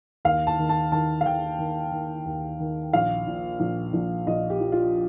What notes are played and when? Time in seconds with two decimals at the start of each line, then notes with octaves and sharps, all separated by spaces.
0.25 D#2 F5
0.47 A5
0.59 D#3
0.69 A5
0.92 D#3 A5
1.21 F5
1.26 D#3 G5
1.59 D#3
1.92 D#3
2.25 D#2
2.60 D#3
2.93 A#1 F5
3.27 A#2
3.60 A#1
3.93 A#1
4.27 A#1 D#5
4.50 G4
4.60 F3
4.72 F4